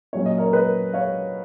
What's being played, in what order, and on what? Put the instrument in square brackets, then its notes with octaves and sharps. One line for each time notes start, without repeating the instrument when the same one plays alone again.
[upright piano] A#2 F#3 C#4 C#5
D#5
A#4 C#5
B4 D#5
C#5 F5